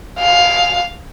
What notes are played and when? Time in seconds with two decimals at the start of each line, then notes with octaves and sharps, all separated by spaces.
0.20 F5